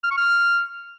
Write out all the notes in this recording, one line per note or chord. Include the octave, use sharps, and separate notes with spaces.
F6
C#6
F6